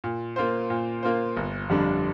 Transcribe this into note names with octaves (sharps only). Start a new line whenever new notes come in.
A#2
A#3 F4 C5
A#2
A#3 F4 C5
G1
F2 D3 G3 D4